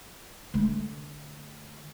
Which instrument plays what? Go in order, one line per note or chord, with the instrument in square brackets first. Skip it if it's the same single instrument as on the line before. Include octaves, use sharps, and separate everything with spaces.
[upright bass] D3 A3